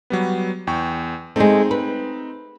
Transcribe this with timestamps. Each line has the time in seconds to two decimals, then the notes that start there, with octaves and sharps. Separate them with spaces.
0.10 F#3 G3 B3
0.67 E2 G5 C#6
1.36 G#3 A3 C4 D#4
1.71 B4